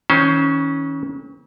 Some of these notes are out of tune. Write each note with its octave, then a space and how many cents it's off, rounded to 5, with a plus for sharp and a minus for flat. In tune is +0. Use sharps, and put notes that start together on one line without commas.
D#3 +45 C#4 +0 C5 +0